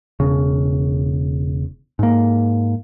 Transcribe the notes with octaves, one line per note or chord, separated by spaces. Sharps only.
E1 C#3
G#2 A#3